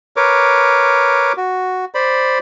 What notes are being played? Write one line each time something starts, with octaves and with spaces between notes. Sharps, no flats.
A#4 B4 C#5 D6
F#4
C5 D5 B5